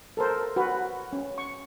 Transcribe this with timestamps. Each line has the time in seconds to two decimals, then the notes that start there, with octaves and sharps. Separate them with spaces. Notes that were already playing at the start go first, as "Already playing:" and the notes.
0.17 A4 A#4 C5
0.56 F#4 B4
1.13 C#4
1.38 C#6